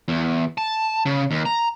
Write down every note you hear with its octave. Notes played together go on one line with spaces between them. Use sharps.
E2
A5
C#3
D#2
A#5